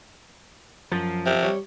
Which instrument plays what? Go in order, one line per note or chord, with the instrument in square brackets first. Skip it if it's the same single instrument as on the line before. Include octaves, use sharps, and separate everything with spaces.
[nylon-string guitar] F#2 [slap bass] F3
[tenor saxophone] C3
[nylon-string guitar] G3 C#5